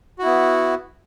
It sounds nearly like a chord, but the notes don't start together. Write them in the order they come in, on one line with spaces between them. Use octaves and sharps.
F#4 E4 B3